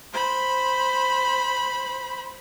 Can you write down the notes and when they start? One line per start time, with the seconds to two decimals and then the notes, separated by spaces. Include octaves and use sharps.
0.13 C5 B5